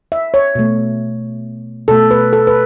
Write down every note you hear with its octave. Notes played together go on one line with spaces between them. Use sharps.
E5
C#5
B2 A3
B2 A3 A4
B4
A4
B4